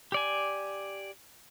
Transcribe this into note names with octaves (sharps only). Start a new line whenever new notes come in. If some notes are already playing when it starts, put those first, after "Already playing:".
G4 D5 G#5